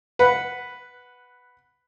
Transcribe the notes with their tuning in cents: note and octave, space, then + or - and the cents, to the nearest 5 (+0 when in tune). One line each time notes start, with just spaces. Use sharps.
B4 +0 F#5 -5